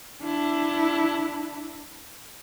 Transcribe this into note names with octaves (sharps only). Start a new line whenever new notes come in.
D4 E4